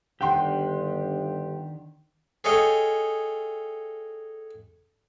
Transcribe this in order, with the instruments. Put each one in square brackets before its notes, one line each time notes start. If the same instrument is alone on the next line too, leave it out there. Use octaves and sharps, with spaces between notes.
[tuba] G1 [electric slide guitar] D#3 D4 G4 [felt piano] F#5 G5 C6
[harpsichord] G#4 A4 C#5 D#5 F5 G5